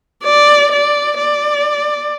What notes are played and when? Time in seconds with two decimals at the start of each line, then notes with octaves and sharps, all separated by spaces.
0.24 D5
0.72 D5
1.18 D5